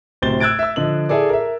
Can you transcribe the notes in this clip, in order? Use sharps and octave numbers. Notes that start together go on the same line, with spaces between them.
D1 C3 C5 A6 G7
E6 F#6 G#6 A6 D7
E5 E6
D3 F3 D#5 F#7
E4 G#4 A4 D5
A#4 E5